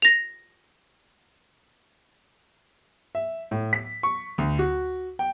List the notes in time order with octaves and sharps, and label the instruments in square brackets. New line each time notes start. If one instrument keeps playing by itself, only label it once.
[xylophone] A#6 F7
[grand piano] E5
A2
B6
C#6
D2
F#4
G5